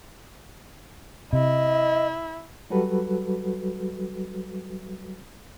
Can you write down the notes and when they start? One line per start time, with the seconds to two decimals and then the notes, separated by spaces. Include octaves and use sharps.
1.33 C3 E4 D#5
2.70 F#3 G3 F#4 A4 B4